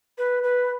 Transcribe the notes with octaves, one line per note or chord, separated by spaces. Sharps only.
B4
B4